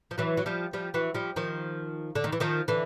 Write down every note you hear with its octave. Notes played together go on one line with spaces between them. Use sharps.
F3
E3 F#3
F#3
F3 G3
F3 G3
E3 F#3
F3 G3
D#3 F3
D3
D#3
E3
D#3 F3
D3 E3